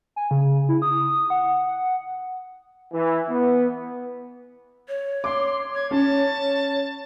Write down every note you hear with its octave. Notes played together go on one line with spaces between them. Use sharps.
G#5
C#3
E4
D#6
F#5
E3
B3
C#5
C6 D6
C#5 G#6
C#4 A5